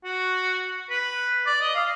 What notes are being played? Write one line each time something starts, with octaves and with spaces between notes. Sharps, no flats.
F#4
B4
D5
D#5
F5